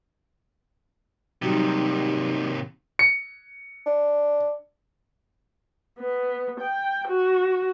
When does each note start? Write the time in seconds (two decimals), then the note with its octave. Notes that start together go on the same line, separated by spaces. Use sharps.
1.42 D#2 C3 F#3 G3 D#4
2.99 C#7
3.86 D4
5.99 B3
6.60 G5
7.08 F#4